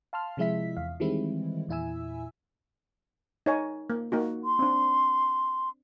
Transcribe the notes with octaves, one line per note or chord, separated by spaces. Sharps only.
F5 A5 C6 F6
C3 F3 G#3 E4 E5 B6
E2 F5
D#3 E3 G3 G#3 C4 E4
E2 A#2 E4 E5 G#5 E6
D#4 C#5 G#5
A#3
A#3 D#4 F#4
C6
C4 D4